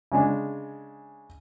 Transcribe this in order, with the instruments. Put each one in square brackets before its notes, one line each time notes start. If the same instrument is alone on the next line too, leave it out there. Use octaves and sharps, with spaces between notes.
[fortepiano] C#3 G#3 D4